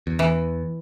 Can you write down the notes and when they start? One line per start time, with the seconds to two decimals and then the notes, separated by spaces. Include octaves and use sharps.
0.07 E2
0.19 E3